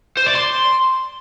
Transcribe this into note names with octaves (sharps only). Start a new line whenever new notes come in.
C5
D5
C6